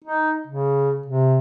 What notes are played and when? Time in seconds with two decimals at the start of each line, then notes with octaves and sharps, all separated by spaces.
0.04 D#4
0.47 C#3
1.06 C3